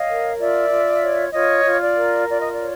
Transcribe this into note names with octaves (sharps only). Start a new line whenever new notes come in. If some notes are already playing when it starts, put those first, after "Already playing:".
Already playing: C#5 D#5 F5
A#4
F4 D5 E5
F4
C#5
F4 C#5 D#5
F4
D5
A#4
F4 D5
D#5
D5
C#5